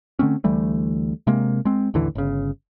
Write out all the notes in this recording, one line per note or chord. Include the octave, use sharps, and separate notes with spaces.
D3 A3 C4 C#4
D2 E3 G3 A3
C3 G#3 A#3
G#3 C4
A1 D#2 D3 E3
G1 C#3